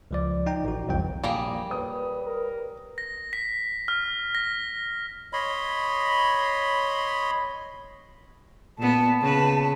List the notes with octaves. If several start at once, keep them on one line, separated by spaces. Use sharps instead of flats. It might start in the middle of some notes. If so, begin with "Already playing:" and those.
C#2 F3 D5
D#4 G5 A#5
A1 F#4
C2 F2 E3 G5
A#1 G3 A#3 G#4
B4 C#5 D#6
A#4
A#6
B6
F6
A#6
C#5 D#5 B5 C6
A#2 B3 A5
C#3 B4